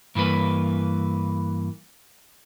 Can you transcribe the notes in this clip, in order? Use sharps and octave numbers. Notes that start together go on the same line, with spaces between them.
G2 E3 A#3 B4